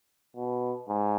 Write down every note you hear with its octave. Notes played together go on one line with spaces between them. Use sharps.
B2
G#2